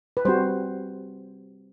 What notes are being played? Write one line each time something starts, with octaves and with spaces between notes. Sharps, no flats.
B4
G3 C4 F#4 C5